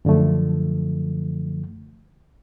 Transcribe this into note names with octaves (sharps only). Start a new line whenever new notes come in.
F#2 D3 F3 A3